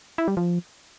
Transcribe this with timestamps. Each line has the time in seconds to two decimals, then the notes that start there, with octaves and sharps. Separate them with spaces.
0.18 E4
0.28 G3
0.37 F3